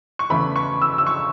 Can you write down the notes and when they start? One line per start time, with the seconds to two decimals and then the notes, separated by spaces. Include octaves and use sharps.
0.19 C#6
0.30 E2 C#3 E3 A3 B5
0.56 C#6
0.82 E6
0.98 E6
1.06 C#6